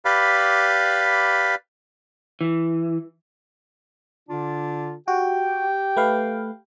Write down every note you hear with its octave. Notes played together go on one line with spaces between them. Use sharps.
G4 B4 D5 F5 B5
E3
D3 D4 F4
F#4 G4 G5
A3 B4 F5